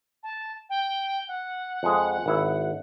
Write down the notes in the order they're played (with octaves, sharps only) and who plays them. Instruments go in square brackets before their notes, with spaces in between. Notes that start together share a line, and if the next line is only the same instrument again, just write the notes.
[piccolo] A5
G5
F#5
[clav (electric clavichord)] F2 G#3
G#1 E4